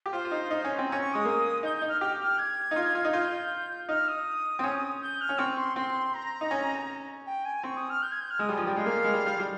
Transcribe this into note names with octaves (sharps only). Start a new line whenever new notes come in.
G4
F4 C5
F4
D#4
D#4
C#4
C4
C#4 A#5
C#6
G#3 D#6
A#3
D#4 G6
G6
D#4
F6
G4 F6
F6
G#6
D#4
F4
F4
D#4
F4 G6
D#4 F6
D#6
C4
C#4
G6
F6
C#4
C4 C#6
C6
C4 C6
A#5
D#4
C#4
G5
G#5
C4 C#6
D#6
F6
G6
G#6
G6
F6
G#3 D#6
G3 G#5
F3
G3 G5
G#3 F5
A#3
G#3
G3
G3
G3